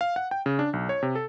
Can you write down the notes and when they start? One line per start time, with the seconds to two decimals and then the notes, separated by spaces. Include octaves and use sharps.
0.01 F5
0.16 F#5
0.31 G5
0.46 C#3
0.59 D4
0.73 B1
0.89 C#5
1.03 C3
1.15 A4